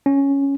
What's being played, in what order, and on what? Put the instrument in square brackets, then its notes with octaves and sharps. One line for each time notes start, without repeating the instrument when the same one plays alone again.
[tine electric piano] C#4